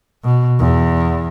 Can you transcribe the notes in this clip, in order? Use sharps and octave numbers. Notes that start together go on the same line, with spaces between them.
B2
E2